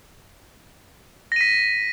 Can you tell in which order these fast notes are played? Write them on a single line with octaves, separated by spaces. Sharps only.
A#6 D#7 B6